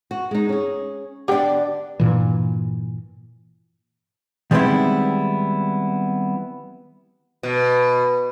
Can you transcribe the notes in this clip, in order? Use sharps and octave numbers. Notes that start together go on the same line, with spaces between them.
F#4
G#3 D#4
C#4 G#4
D3 B3 D4 G4 D5 G5
G2 A#2 E3
D#3 G3 G#3 B3 C4 E4
B2